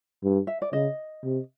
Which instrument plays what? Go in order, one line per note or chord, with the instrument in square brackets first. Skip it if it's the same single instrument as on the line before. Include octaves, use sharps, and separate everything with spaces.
[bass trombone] G2
[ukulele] E5
D5
[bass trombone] C#3 [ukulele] D#5
[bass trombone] C3